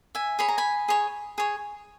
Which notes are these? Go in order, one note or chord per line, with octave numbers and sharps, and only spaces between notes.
E5 G#5
G#4 C#5 B5
A#5
G#5 B5
G#4 C#5
G#4 C#5